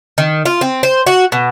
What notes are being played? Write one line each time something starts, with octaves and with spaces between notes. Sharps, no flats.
D#3
F4
C4
C5
F#4
B2